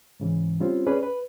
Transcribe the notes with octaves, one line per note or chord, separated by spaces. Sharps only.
G#2 C#3 E3
G3 C4 C#4 F4
C#4 G#4 B4 D5
B4